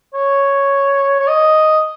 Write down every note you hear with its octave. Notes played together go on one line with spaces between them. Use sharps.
C#5
C#5
D#5